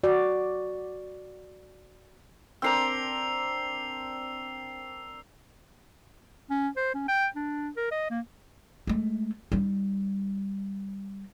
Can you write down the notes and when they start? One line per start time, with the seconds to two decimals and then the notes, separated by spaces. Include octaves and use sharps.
0.03 F#4 D5
2.62 C4 D4 A#4 E6 C7 F7
6.50 C#4
6.77 C5
6.95 C#4
7.08 G5
7.36 D4
7.77 A#4
7.91 D#5
8.10 A#3
8.87 G#3 A3
9.52 G3 D#4